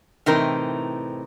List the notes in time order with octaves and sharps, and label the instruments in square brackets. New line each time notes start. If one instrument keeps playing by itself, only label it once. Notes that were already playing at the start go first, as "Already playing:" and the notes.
[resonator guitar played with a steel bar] A2 C3 E3 C4 D#4 A#4